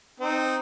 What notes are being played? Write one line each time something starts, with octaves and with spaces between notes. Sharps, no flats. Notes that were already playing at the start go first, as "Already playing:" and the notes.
C4 D#4